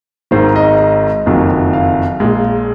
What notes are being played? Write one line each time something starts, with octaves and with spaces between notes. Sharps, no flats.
G#1 G#2 D#3 C5
D#5
D#5
F#1 F2 D#3 F#3
F5
A#1 A#2 G#3